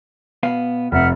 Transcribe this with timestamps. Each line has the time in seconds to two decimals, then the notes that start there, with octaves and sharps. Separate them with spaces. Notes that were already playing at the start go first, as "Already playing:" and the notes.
0.43 B2 B3 F5
0.92 F1 E5 F#5 F6